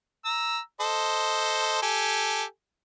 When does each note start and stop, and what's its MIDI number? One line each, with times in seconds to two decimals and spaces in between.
0.25 0.59 82
0.25 0.59 88
0.80 1.79 69
0.80 1.79 72
0.80 1.79 75
1.82 2.44 67
1.82 2.44 69
1.82 2.44 80